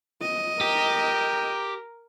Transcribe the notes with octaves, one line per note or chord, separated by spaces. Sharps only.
D#5
G4 A#4